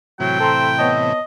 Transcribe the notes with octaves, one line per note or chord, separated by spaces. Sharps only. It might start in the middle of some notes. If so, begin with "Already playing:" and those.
A2 C3 E3 F#3 G5
C4 A4 A#5 C6
B3 C#5 D#5 A5